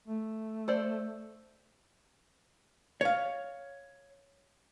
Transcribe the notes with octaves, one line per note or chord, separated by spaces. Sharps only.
A3
A4 C5 D5
C#5 F5